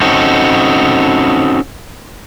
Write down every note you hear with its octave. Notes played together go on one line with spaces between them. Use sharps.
C4 C#4 D#4 F#4 A4